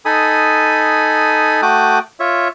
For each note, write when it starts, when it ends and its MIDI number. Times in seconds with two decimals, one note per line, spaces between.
0.05 1.61 63
0.05 1.61 69
0.05 1.61 80
0.05 1.61 83
0.05 1.61 87
1.62 1.99 57
1.62 1.99 66
1.62 1.99 79
1.62 1.99 86
1.62 1.99 87
1.62 1.99 90
2.20 2.48 65
2.20 2.48 73
2.20 2.48 76